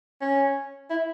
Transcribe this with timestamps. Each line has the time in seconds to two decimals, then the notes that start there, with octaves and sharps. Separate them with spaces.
0.21 C#4
0.90 E4